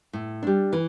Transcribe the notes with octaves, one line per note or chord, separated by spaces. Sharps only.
A2
G3 D4
E3